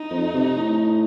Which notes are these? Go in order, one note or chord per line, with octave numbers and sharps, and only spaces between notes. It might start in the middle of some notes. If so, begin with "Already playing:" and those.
Already playing: D#4
F2
C3
A2